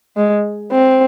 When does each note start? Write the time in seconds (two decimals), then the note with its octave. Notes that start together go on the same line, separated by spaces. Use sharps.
0.16 G#3
0.71 C4